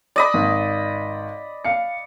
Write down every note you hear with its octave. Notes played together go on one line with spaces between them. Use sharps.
D5 D#5 B5
G#1
F5 C#7